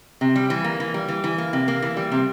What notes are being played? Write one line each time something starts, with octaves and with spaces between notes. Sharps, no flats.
C3
G3
E3
A#3
E3
G3
E3
E3
A#3
C3
A#3
E3
G3
C3